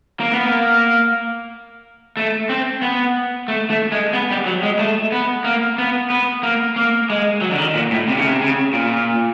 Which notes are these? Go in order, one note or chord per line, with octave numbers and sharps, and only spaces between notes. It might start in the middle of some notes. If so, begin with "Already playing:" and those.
A#3
B3
A#3
A3
C4
B3
A3
A3
G#3
B3
G3
F#3
G#3
A3
B3
A#3
B3
B3
A#3
A#3
G#3
F#3
D3
D#3
A#2
A2
C3
C#3
C3
C#3
A#2